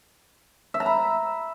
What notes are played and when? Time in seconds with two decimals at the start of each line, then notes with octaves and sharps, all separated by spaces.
0.74 E5
0.80 A#5
0.86 B5